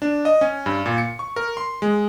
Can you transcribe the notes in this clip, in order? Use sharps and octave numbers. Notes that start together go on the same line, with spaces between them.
D4
D#5
C#4
G2
A#2
C#7
C#6
A#4
C6
G#3